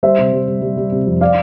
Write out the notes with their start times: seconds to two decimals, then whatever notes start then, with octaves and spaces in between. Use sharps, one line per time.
0.03 G3 C5 E5
0.18 C3
0.33 G3
0.47 G3
0.62 G3
0.77 G3
0.92 C3
1.07 F2
1.21 D5 F5